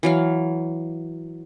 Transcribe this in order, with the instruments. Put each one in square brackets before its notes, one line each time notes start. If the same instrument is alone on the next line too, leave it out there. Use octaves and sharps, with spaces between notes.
[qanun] E3 F#3 F5